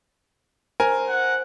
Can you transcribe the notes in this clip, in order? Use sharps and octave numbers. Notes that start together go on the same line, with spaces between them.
A#4 C5 G#5
F#5